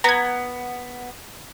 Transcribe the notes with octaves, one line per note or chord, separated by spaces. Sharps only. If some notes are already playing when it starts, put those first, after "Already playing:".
B3 A#5 G#6